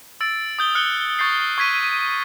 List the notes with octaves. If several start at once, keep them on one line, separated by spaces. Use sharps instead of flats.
E6 A6 D7
D#6 G6 G7
F6 F#6 C#7 G7
C#6 G6 A6 C7
C#6 G#6 B6 D#7